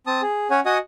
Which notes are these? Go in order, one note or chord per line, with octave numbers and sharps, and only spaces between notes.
C4 A5 D#6
G#4
C#4 C#5 F#5 G#5
F#4 D#5 F#5 G#5 D#6